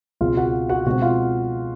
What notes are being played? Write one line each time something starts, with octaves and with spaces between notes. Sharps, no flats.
C#2 B2 G#3 C4 F4 F5
F#4 F#5
F#4 F#5
B2 G#3 C4 F#4 F#5
F4 F5